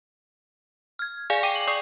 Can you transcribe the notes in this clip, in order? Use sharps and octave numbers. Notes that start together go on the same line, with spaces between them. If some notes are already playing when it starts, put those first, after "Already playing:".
F6 G#6
G#4 D5 F5 G#5
G5 D6 D#7
F#7
D5 C#6 D#6 C7